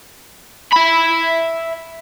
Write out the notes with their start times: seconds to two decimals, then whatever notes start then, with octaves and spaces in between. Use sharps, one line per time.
0.72 E5 B5